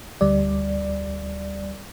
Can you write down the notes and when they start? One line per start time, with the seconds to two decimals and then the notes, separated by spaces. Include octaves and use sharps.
0.21 D2 G3 D5